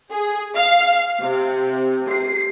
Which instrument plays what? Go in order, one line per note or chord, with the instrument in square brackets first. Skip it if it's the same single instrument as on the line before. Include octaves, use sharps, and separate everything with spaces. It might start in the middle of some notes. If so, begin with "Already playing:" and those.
[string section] G#4
F5
C3
C7